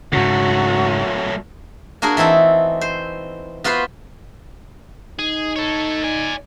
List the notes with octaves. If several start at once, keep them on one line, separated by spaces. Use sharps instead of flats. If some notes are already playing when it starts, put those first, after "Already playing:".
G#2 C#3 F#3 A3 F#4
A#3 D4 F#4 G#4 A#4
E3 C4 D#4 E4 A4
C5
B3 F4 F#4 B4 C5
D#4 G#4
A4 C#5
D5 G#5